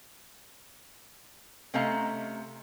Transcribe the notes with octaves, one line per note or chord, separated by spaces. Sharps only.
C3 A3 C#4 D#5 F5 A#5